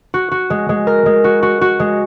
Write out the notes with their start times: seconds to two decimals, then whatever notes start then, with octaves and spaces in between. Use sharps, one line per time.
0.14 F#4
0.32 F#4
0.50 G#3
0.69 G#3
0.87 A#4
1.06 G#3
1.24 F#4
1.43 F#4
1.61 F#4
1.80 G#3